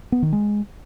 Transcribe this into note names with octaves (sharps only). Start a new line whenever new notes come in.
B3
D#3
G#3